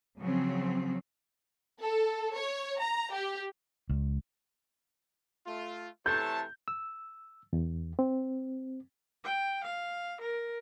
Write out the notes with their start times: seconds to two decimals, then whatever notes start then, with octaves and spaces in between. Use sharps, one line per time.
0.20 C#3 F3 F#3 C4
1.81 A4
2.34 C#5
2.79 A#5
3.12 G4
3.89 C#2
5.46 A3 F4
6.06 C3 E3 A3 A4 C#5 A5 G6
6.68 E6
7.53 E2
7.99 C4
9.24 G5
9.64 F5
10.21 A#4